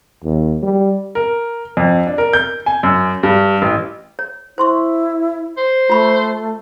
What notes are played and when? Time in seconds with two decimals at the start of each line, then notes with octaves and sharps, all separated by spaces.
0.24 D#2
0.63 G3
1.15 A#4
1.77 F2
2.07 D4
2.18 A#4
2.33 G6
2.66 G#5
2.83 F#2
3.23 G2
3.62 A1
4.19 C#5
4.58 E4 C5 C6 C#6
5.57 C5
5.90 A3 F4 B5 C#6